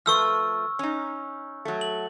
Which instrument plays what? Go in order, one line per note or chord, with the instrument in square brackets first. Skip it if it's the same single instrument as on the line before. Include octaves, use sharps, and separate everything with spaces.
[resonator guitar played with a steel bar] F3 A3 B4 [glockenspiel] C#6 E6 F6
[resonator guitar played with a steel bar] C#4 D#4
F#3 A3
[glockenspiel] F#7